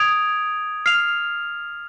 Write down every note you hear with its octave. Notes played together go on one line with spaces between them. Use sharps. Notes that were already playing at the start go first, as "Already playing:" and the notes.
Already playing: D#6 G#6 D7 F7
F6 C7 F7